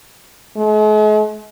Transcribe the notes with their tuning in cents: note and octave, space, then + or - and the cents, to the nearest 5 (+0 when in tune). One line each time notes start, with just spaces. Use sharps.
G#3 +45